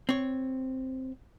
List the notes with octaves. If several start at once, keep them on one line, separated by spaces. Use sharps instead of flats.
C4 C#5